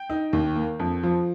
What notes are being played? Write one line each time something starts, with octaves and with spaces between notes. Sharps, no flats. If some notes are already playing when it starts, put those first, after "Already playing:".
Already playing: G5
D#4
D#2
A#3
F2
F3